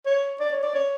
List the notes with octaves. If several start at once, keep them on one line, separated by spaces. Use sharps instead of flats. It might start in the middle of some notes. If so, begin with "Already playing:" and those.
C#5
D5
C#5
D5
C#5